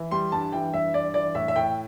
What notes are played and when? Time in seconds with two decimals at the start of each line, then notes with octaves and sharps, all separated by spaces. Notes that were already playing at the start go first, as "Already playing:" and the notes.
Already playing: E3
0.11 G3 C6
0.32 G2 A5
0.52 E3 G5
0.74 G2 E5
0.94 G2 D5
1.14 E3 D5
1.35 A2 E5
1.48 E5
1.56 A2 G5